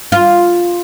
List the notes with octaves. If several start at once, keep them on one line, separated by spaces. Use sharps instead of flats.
F4